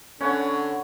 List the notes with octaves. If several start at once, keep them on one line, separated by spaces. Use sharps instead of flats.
D3 C#4 B4 C#5 F#5